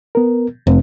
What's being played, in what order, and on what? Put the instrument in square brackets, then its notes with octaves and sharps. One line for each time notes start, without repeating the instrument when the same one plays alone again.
[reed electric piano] B3 A#4
[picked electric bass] F1 [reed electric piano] C4